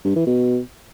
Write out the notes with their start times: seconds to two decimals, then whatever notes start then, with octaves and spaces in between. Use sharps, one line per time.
0.05 G2
0.16 E3
0.27 B2